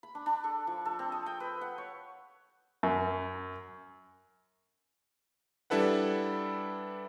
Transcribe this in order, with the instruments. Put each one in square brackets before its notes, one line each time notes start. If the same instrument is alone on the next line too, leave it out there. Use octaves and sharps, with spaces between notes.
[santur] B5
D4
D4
A4
F3
A4
C4
D#6
G5
B4
F#5
C#5
[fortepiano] F#2
[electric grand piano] G3 D4 E4 A4 B4 F#5